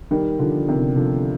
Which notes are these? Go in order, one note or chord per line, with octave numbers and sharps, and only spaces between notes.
D#3 G3
D3 F3
C3 D#3
D3 F3